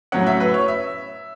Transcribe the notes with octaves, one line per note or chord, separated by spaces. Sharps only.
A2 F#3 C#4 F#5
E5
B4
C#5
E5